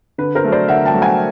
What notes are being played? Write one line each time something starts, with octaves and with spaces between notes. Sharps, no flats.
D3 B4
A#4 C5
F#3 A3
C5 D5
D3 E5 F#5
G5 A5
F#3 A3
F#5 G#5